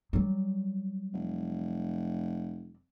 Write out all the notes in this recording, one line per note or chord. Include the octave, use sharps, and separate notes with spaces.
F#3 G3
F1